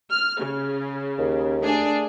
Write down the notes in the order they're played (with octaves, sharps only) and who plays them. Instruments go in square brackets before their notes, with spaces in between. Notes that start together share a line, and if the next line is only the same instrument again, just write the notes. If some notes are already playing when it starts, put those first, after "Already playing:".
[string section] F6
C#3
[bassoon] D#2
[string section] A3 D4 G#4